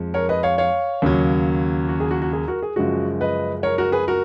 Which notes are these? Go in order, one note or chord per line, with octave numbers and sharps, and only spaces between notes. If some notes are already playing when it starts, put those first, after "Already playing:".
Already playing: F2 F3 G#3
A#4 C#5
B4 D#5
C#5 F5
C#5 F5
D#2 C#3 F#3
F#4
G#4
F#4
F#4
G#4
F#4 A#4
G#4
F#2 C#3 F3 G#3 F#4
B4 D#5
A#4 C#5
F#4 A#4
G#4 B4
F#4 A#4